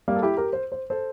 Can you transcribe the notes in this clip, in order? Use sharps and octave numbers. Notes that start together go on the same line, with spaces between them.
G3 A#3
A4
E4 G4
G4 A#4
C5
C5
A4 C5